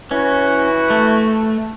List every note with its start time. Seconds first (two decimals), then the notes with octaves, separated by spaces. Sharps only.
0.11 E3 C#4 E4 F#4
0.90 A3